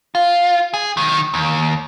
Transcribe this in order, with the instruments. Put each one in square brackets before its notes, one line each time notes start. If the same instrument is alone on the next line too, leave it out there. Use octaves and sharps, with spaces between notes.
[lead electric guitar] F4
G#4
D#3 F#3
D#2